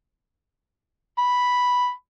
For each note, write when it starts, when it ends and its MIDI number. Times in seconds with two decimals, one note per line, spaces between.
1.18 1.91 83